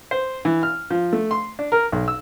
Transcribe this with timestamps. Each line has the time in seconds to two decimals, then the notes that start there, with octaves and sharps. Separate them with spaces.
0.11 C5
0.45 E3
0.63 F6
0.91 F3
1.13 A3
1.31 C6
1.59 D4
1.72 A#4
1.92 B1
2.08 E6